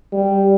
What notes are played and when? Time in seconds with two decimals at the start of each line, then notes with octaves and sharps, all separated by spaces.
0.13 G3